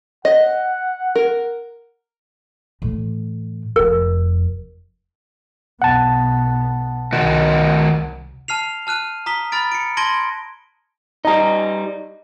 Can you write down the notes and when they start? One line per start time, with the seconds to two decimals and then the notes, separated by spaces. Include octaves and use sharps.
0.25 D#5 F#5
1.16 A#4
2.82 A2 E3
3.76 F1 F2 A#4
5.82 B1 B3 F#5 A5
7.13 C2 D#3 F#4
8.48 A5 F6 C7 F7
8.87 A5 F6 F#6 D#7
9.26 A#5 D#6 B6 G7
9.52 B5 F6 A6 D7
9.72 C#7 D7
9.97 A5 C6 G#6 A#6 D7 G7
11.25 G3 D#4 D#5 A#5